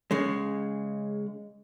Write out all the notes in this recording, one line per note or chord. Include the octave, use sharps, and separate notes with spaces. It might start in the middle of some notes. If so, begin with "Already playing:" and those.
C#3 G#3